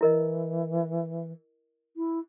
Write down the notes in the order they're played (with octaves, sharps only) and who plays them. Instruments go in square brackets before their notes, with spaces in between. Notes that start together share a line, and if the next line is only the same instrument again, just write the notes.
[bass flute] E3 [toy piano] E4 A#4 D#5
[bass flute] E4